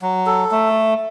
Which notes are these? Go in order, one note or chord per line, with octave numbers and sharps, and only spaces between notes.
F#3
A4
A3